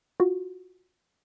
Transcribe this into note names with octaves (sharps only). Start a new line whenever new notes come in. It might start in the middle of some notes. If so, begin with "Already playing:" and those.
F4 F#4